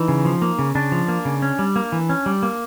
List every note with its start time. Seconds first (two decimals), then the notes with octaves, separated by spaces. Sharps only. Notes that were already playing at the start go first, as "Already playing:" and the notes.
Already playing: E3 D#4
0.08 C#3
0.25 F3
0.42 A#3
0.59 C#3
0.75 C#3 D4
0.92 F3
1.08 A#3
1.25 C#3
1.42 C#4
1.59 G3
1.76 A#3
1.92 E3
2.09 C#4
2.26 G3
2.43 A#3